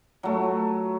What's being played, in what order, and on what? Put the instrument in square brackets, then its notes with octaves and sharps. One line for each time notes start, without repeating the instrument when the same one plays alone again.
[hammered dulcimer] F#3 A3